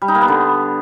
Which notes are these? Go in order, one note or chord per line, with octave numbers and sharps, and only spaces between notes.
G3
D#4
A#3
B3
D3